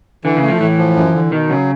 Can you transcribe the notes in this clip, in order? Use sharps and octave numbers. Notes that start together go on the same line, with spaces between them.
D3 E3
C#3
A3
F3
A2 E3
F3
F#2
D3
B2 D#3
C#3 F#3